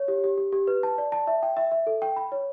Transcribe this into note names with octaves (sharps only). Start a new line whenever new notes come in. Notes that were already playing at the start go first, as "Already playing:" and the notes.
Already playing: C#5
G4
G4
G4
G4
B4
A5
D5
A5
E5
G5
E5
E5
A4
G5
B5
C#5